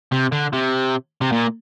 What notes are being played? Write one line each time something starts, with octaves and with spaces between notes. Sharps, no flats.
C3
D3
C3
C3
A#2